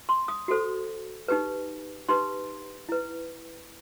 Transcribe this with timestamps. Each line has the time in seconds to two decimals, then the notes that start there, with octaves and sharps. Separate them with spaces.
0.09 C6
0.28 D#6
0.48 F#4 A4 C5
1.28 D#4 G4 B4
2.09 D#4 G4 B4 C6
2.89 E4 B4